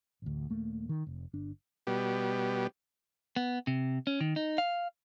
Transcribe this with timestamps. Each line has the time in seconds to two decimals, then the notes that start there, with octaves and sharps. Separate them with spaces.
0.22 A1 D2
0.50 D#1 A3 A#3
0.89 D#3
1.07 F1
1.33 G1 D4
1.87 B2 G3
3.36 B3
3.67 C3
4.07 C#4
4.20 D#3
4.36 D#4
4.58 F5